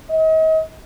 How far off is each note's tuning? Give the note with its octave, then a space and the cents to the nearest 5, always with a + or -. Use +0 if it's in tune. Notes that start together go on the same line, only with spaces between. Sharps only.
D#5 +35